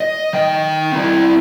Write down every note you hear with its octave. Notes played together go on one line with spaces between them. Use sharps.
D#5
D#3 G5
C4 E4